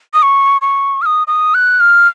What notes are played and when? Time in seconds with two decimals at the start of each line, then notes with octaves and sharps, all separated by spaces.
0.14 D#6
0.23 C#6
0.61 C#6
1.02 F6
1.06 D#6
1.27 D#6
1.54 F#6
1.80 F6